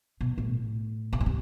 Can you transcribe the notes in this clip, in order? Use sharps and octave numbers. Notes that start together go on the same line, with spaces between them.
B2
A2
C3
B2
C3